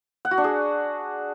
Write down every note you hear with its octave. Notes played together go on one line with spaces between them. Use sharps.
F#5
F#4
D4
G#4